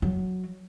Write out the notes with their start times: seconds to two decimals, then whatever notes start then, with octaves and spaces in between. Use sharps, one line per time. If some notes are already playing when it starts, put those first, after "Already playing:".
0.02 F#3